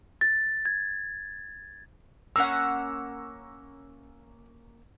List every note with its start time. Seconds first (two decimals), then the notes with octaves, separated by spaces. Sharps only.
0.21 A6
0.65 G#6
2.36 A#3 C#4 F#5 E6